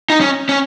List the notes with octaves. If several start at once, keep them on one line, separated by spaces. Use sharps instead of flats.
D#4
C#4
C#4